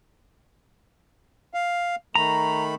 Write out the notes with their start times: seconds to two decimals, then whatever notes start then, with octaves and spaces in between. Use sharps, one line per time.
1.54 F5
2.15 D#3 A3 A#5 B5